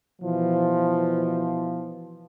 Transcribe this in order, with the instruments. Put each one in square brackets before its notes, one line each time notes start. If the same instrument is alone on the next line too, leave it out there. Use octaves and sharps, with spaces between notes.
[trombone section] B2 E3 F3